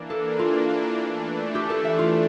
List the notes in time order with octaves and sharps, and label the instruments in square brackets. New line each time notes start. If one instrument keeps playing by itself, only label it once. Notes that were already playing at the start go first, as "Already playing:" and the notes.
Already playing: [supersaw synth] E3 A#3 D4 [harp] D5
[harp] A4
F4
[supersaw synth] E3 A3 D4
[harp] G4
A4
E5
F4